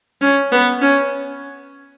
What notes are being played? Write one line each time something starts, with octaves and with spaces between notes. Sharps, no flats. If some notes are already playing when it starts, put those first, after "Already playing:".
C#4
B3
C#4